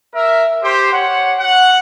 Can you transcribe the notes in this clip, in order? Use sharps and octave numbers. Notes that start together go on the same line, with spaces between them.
A#4 E5
G4 C5
C#5 F#5
F#4 F#5